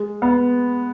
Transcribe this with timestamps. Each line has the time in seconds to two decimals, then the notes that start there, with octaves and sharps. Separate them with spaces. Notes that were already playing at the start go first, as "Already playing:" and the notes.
Already playing: G#3
0.22 B3